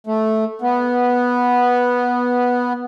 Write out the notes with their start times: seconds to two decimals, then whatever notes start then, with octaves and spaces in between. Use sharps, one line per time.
0.07 A3
0.62 B3